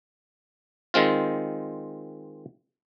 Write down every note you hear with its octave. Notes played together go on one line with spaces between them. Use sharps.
D#3 G#3 C4 F4